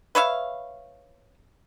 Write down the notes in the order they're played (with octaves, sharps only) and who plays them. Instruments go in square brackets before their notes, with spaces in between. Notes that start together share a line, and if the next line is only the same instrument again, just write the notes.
[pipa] B4 C#5 E5 F5